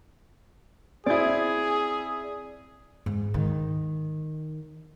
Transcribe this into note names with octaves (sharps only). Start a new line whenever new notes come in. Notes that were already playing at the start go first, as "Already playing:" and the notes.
C4 E4 G#4 D5 D#6 G#6
G#2
D#3